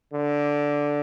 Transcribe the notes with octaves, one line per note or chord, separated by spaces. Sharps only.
D3